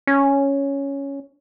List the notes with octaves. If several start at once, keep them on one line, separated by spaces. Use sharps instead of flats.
C#4